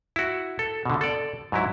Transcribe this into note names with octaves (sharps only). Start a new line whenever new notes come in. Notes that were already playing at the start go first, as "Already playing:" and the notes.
E4 F#4
A4
B2 D3
A4 D5
G#2 F#3 E4